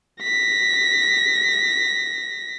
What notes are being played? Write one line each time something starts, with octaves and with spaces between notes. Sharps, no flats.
A#6 B6